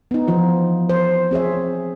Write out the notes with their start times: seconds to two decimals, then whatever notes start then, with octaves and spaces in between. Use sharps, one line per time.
0.11 B3 D#4
0.28 E3 F3 F4
0.89 C5
1.31 C4 G#4 C#5 E5